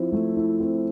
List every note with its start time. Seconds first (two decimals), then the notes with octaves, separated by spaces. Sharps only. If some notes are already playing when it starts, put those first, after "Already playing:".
Already playing: F3 C4 E4
0.12 A3
0.37 E4
0.60 C4